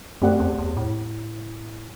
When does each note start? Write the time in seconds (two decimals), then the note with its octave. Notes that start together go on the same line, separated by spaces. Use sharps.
0.22 F#2 A3 C4 G4 D5 F#5
0.40 E2
0.58 E2
0.77 A2